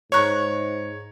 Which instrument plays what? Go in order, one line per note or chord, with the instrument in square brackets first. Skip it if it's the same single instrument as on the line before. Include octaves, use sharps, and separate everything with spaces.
[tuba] G#2 [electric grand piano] C#5 A#5 [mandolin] C#6 F#6